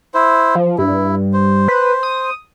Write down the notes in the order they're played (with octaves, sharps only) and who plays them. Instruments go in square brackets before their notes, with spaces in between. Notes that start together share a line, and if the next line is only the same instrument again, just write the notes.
[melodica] E4 C5
[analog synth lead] F3
[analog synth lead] G2 [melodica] E4
[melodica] C5
[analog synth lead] B4
D#6